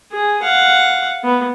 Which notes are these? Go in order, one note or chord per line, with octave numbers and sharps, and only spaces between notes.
G#4
F5 F#5
B3